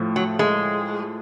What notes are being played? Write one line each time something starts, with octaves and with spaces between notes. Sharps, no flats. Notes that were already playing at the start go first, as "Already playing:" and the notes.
Already playing: A2 F3 A3
F#3
G#3